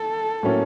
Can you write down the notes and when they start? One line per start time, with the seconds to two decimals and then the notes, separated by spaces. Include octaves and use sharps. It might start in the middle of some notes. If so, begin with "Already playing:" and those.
Already playing: A4
0.43 A2 F#3 A#3 C#4